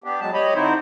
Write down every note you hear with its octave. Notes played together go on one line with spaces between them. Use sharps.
B3 D4 G4
F#3 G#3 A5
G4 C#5 D#5 B5
D3 C4 D#4 E4 C5